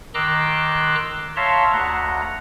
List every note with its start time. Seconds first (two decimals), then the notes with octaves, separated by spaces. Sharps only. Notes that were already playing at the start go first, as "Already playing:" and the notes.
0.14 D#3 A#5 C6 D6 E6 F#6
1.36 C#5 E5 F5 A5 A#5 C6
1.73 D2 F#5 A#5